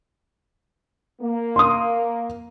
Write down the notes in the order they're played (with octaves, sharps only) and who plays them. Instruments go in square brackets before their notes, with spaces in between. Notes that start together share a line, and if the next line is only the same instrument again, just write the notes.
[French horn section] A#3
[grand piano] C6 D#6